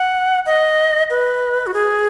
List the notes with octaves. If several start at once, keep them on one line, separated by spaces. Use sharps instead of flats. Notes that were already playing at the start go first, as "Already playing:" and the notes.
Already playing: F#5
D#5
B4
F#4
G#4